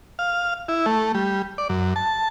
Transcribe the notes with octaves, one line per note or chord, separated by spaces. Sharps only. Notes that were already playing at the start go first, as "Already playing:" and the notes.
F5
E4
A3
G3
D5
F#2
A5